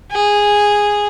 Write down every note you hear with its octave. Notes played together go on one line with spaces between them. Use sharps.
G#4